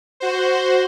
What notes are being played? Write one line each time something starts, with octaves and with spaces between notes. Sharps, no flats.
F#4 C5